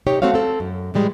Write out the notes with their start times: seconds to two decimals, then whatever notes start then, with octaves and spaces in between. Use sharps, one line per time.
0.06 C3 D#4 G4 C#5
0.22 A3 C4 F#4 C#5 F5
0.34 C4 A4
0.60 F#2
0.94 A2 E3 G3 G#3